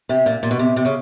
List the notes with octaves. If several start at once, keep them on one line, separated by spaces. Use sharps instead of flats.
C3
A#2
A#2
B2
C3
C3
C#3